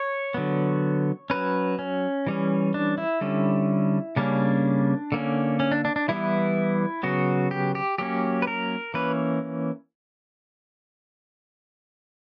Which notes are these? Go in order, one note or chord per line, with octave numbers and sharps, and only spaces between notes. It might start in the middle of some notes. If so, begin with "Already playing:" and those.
Already playing: C#5
D3 F#3 B3
F#3 C#4 B4
C#4
E3 G3 C#4
D4
E4
D3 G3 C#4
C#3 G3 A#3 C#4 D4
D3 A#3 C#4
C#4
D4
D4
D4
E3 G3 B3 E4
C#3 F#3 B3 F#4
G4
G4
F#3 A#3 C#4 G4
B4
A#4
E3 A#3 C#4 B4